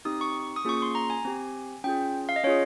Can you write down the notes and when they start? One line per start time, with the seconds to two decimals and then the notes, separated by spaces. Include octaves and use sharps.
0.05 C4 D#4 G4 D#6
0.21 C#6
0.56 D#6
0.65 A#3 C#4 F4 G#4 C#6
0.82 C6
0.95 A#5
1.10 G#5
1.25 C4 G4
1.84 C#4 F4 G#4 G5
2.29 F5
2.36 D#5
2.44 C#4 F4 G#4 C#5